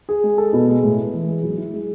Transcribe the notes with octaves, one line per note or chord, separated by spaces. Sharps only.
G#4
G#3
A4
B2
G#3
A2
B3
E3
G#3
F#3
E4
G#3